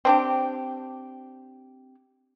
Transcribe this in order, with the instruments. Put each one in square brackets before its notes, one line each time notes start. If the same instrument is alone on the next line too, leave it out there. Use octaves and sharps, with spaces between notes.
[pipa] C4 D4 G4